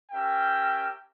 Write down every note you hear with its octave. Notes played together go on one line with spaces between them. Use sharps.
C#4 G4 A#4 E5 G5